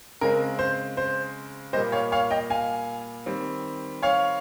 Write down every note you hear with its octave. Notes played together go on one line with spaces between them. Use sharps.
C#3 G#3 C4 A#4
C5
C5
A#2 G3 A#3 C5 D#5
C#5 F5
C#5 F5
D#5 G5
F5 G#5
D#3 G3 C4
C#5 F5